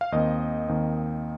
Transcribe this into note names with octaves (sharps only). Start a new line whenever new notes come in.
F5
D#2 D#3 C4 D#5
D#2 D#3 C4